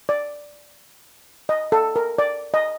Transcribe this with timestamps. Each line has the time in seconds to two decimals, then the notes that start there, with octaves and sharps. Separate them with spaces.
0.09 D5
1.49 D#5
1.72 A4
1.96 A#4
2.18 D5
2.54 D#5